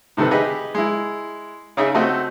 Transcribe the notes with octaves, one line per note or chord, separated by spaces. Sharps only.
A2 C3 D#3 A4 B4
G4 G#4 B4 D#5 E5
G#3 E4
C#3 C#4 D#4 G#4 E5
A3 C4 F#4 D#5